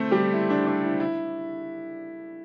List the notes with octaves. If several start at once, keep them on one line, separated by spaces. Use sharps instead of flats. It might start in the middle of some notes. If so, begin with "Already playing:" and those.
Already playing: A3 C4 A4 C5
G3 G4
E4
D4
D4
E4
E4